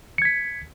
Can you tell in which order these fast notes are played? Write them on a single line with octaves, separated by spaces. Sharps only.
C#7 G#6 B6